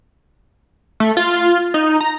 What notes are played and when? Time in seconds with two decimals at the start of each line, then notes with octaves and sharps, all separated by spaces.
1.00 A3
1.17 F4
1.74 D#4
2.01 A#5